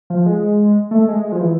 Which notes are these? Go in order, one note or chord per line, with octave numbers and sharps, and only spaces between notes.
F3
G#3
A3
G#3
G#3
F3
E3